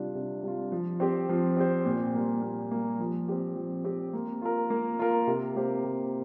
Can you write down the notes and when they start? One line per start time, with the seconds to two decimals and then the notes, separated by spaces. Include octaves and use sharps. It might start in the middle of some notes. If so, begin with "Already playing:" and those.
Already playing: C3 G3 D4 F4
0.15 C3
0.43 G3 D4 F4
0.72 F3
1.00 C4 G4 C5
1.29 F3
1.57 C4 G4 C5
1.85 A#2
2.14 G3 A#3
2.42 A#2
2.71 G3 A#3
2.99 F3
3.28 C4 G4
3.56 F3
3.84 C4 G4
4.13 A#3
4.42 F4 A#4
4.70 A#3
4.99 F4 A#4
5.27 C3
5.55 A#3 G4 C5
5.84 C3